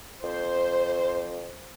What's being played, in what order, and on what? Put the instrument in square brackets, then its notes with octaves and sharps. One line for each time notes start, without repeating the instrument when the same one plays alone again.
[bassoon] F2 [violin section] C5